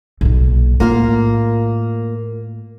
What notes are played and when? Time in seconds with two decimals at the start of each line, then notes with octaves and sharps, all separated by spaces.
0.21 B1 A#2
0.80 A2 A#3 F4 F5